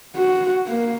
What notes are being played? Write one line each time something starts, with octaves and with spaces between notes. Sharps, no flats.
F#4
A#3